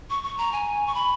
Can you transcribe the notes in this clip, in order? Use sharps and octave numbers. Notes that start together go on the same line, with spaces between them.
C#6
C#6
A#5
G#5
C#6
B5